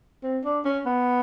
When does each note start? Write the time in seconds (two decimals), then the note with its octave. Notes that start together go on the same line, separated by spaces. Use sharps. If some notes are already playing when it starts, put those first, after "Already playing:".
0.23 C4
0.45 D4
0.65 C#4
0.86 B3